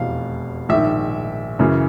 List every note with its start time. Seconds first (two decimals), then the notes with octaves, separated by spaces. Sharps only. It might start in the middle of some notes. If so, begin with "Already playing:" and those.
Already playing: F1 E2 B2 F5
0.69 A#1 G#2 D#3 E5
1.59 F#2 C#3 E3